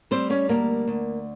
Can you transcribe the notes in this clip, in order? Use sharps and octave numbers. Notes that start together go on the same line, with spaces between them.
G3 C4 C5
C#4 C#5
D2 A#3 A#4
D2